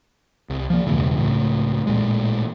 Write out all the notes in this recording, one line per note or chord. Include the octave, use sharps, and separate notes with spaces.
C2
F3 A#3
E1 C#2 G2 E3
C#2 A2
A1 A#2 G#3